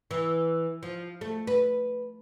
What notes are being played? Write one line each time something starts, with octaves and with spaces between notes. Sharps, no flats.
E3
F3
A3
B4